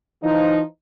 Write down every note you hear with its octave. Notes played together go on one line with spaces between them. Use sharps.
E3 F3 D#4